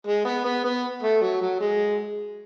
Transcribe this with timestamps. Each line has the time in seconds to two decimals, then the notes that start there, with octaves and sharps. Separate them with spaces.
0.07 G#3
0.25 B3
0.45 B3
0.64 B3
1.03 A3
1.22 F#3
1.41 F#3
1.60 G#3